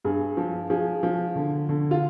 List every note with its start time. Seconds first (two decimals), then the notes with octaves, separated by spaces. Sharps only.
0.05 G2 G#4
0.37 F3
0.70 F3 G#4
1.03 F3
1.36 D3
1.69 D3
1.91 F4